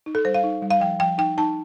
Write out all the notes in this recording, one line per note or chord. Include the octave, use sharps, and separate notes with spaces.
D#4
A4
G3 C5
F5
D#4
G3
F5
F3 G5
F3 G5
D#4 G5
D#4 A5